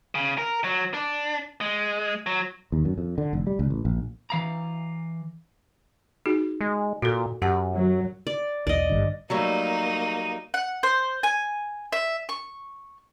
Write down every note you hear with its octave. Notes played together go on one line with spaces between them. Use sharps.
C#3
A#4
F#3
D4
G#3
F#3
D#2
F#2
F2
D3
F1
G3
C#2
A1
A#1
E3 F5 A#5
D#4 F#4 G#4
G#3
A#2 F#4 A4
F#2 G4 F#5 A5
F#3
D5
B1 E2 D5 D#5
G#1 G2 D3
F#3 G3 A3 A#3 D#4
F#5
C5
G#5
E5
C#6